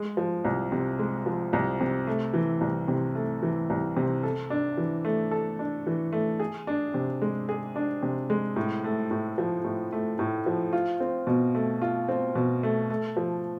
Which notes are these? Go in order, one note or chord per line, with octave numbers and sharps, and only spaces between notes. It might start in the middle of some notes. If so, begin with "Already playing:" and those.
Already playing: G#3
F3
C2
C3
G#3
F3
C2
C3
A3
E3
C2
C3
A3
E3
C2
C3
A4
D4
E3
A3
A4
D4
E3
A3
G#4
D4
C3
G#3
G#4
D4
C3
G#3
A2
A3
A2
F3
A2
A3
A2
F3
F4
C4
B2
A3
F4
C4
B2
A3
A3
F3